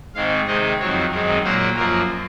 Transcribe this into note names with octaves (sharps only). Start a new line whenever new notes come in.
G#2 D#3 G#3 C4 F5
C3 D#3 G#3 C4 D#5
F2 D#3 F#3 C4 C#5
F#2 D#3 G#3 C4 A#4
A#2 F#3 A#3 C5
F#2 F3 A#3 A#4